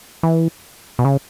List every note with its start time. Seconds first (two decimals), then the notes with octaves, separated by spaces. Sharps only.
0.23 E3
0.99 B2
1.05 C#3